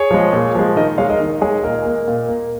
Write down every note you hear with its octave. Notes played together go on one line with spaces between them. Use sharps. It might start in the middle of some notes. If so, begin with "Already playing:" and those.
Already playing: G#4 C#5
F3 G#3
A#2
F3 G#3
D#3 A#4 D#5
G#3 C#5 F5
A#4 D#5
D#3
G#3 G#4 C#5
A#2 A#4 D#5
A#3
A#2
A#3